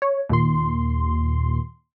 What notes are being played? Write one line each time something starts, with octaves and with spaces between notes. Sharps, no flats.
C#5
D#2 A#2 C6